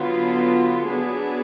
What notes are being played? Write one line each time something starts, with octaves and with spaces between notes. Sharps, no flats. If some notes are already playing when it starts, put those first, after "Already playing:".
Already playing: D3 F#3 B3 F4
F#3 B3 D4 G#4